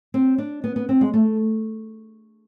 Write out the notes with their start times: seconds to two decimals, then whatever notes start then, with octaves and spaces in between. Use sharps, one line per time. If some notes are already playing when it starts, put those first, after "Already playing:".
0.14 C4
0.38 D4
0.64 B3
0.76 B3
0.89 C4
1.01 G#3
1.14 A3